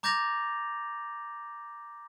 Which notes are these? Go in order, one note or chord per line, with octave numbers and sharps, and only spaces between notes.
A#5 D6 G6 A6 A#6 F7